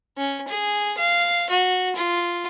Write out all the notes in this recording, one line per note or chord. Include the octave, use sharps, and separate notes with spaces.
C#4
G#4
F5
F#4
F4